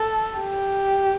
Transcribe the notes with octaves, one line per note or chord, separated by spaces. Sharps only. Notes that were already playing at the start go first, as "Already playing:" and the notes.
Already playing: A4
G4